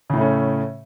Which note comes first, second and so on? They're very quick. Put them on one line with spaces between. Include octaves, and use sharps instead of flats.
C#3 A2 A3 C#4